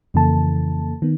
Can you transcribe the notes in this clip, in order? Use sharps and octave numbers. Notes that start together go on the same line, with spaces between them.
F2 C#3 E3 A#3 A4 A5
D#3 B3